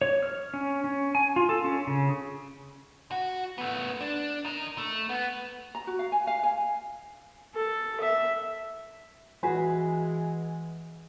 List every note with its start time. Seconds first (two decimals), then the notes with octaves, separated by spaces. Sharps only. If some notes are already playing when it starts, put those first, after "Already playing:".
0.02 C#5
0.23 F6
0.54 C#4
0.84 C#4
1.15 G#5
1.36 F4
1.49 A4
1.64 C#4
1.87 C#3
3.11 F#4
3.58 A3 B3
4.01 D4
4.45 D#4 A#4
4.78 A3
5.09 B3
5.75 A#5
5.87 F#4
5.99 F5
6.12 G#5
6.27 F5
6.43 G#5
7.55 A4
8.00 E5
9.43 E3 G#3 F#4 G#4 B4